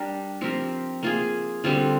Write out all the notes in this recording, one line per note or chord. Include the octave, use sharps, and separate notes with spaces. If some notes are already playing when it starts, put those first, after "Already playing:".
Already playing: G3 D4 G4 A#4
F3 C4 G4 A#4
A#3 F4 G#4
D3 G3 C4 F4